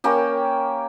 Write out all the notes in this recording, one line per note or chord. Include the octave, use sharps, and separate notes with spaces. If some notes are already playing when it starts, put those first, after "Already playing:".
A#3 C#4 G4